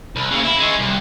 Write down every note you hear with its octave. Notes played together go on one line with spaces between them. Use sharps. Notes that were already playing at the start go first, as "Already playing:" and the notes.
C2
C#3 A#3
E4
G#3 C#4
C2